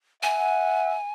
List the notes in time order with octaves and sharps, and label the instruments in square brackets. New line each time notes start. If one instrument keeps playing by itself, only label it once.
[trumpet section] E5 F#5 [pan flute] G#5